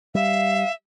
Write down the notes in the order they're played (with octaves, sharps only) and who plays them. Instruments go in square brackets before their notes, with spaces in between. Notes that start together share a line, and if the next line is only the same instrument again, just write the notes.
[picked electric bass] G3 [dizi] E5 [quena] F5